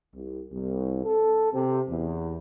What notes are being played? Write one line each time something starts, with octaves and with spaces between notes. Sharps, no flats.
C2
C2
A4
C3
E2